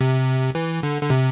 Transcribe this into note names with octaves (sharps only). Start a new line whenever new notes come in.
C3
E3
D3
D3
C3